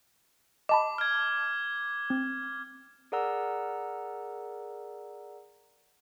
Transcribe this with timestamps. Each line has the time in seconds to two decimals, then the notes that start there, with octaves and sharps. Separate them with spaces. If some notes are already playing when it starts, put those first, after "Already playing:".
0.69 D#5 A5 B5 D6
0.98 F6 G#6
2.10 C4
3.12 G#4 A#4 D5 F#5 A#5 E6